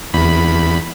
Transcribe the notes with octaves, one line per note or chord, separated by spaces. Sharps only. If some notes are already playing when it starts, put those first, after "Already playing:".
E2 B5